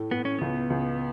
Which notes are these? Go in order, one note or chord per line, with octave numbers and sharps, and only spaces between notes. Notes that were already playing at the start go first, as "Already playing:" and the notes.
Already playing: A2 A3
A2 B3
C#4
C#2 B3
C#2